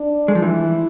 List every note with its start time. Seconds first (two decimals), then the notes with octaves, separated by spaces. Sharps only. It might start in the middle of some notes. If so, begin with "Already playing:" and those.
Already playing: D4
0.28 G#3
0.35 F3
0.42 E3 E4